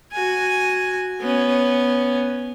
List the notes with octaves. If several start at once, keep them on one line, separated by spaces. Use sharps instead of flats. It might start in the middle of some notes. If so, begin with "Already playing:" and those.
F#4 G#5
B3 C#4